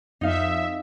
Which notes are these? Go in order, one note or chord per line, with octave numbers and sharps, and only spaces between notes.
F2 D#4 E5 F5